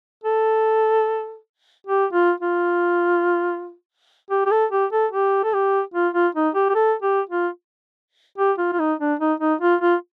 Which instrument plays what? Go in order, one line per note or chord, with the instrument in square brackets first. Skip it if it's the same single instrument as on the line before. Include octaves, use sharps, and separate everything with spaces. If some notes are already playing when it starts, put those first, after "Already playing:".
[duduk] A4
G4
F4
F4
G4
G4
A4
G4
A4
G4
A4
G4
F4
F4
D#4
G4
G4
A4
G4
F4
G4
F4
F4
D#4
D4
D#4
D#4
F4
F4